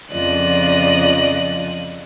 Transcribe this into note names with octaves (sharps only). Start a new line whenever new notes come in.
F2 C#3 F3 D5 D#5 F#6